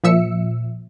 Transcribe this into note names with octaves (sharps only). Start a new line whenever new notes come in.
A#2 F3 E5 E6 C#7